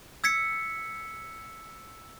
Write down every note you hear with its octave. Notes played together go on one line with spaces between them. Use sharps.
E6 G#6 B6 C#7